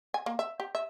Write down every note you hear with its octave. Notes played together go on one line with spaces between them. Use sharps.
G#5
A#3
E5
G4
E5